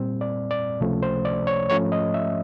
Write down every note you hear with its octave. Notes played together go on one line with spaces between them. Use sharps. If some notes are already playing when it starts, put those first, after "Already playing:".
Already playing: A#2 G3 C4
D5
D5
C#2 C3 F3 A3 C#4
C5
D5
C#5
G#2 F3 A3 C#4 C#5
D#5
E5